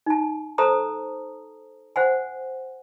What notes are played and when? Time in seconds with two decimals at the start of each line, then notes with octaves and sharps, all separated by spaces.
0.06 D#4 A5
0.58 A4 C5 A5 A#5 D#6
1.96 C5 F#5 G#5